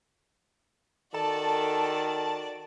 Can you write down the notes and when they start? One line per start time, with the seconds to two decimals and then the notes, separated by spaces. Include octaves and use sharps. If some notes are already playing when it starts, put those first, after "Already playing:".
1.14 D#3 F#4 A4 D5 A5